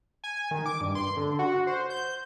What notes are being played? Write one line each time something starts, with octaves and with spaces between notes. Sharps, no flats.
G#5
D#3
D6
G2
C6
D3
F#4
C5
G6